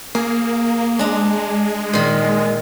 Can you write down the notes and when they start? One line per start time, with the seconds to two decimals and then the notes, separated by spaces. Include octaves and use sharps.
0.15 A#3 G#4
0.99 G#3 D4 A#5
1.93 A#2 D#3